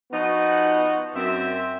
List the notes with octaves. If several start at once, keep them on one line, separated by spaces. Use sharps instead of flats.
F3 B3 D#4 F4 F#4
F#2 C4 E5